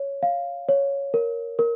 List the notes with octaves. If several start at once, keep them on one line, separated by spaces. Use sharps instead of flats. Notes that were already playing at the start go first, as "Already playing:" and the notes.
Already playing: C#5
F5
C#5
A#4
A#4